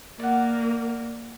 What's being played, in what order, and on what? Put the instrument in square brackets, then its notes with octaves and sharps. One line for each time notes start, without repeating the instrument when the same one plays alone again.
[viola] A#3 [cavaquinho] D5 F#5